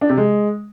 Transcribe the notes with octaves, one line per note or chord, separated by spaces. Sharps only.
D4
C3
G#3